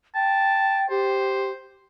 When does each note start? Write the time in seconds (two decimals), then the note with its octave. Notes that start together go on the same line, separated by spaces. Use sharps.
0.15 G5 A5
0.90 G4 C5